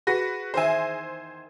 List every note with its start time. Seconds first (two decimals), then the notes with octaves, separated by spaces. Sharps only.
0.07 F#4 G#4 B4 A#6
0.54 E2 D#3 C5 E5 G#5